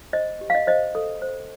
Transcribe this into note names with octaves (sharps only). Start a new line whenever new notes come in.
C5 D#5
G4
F5
D#5
C5 D#5
A4
C5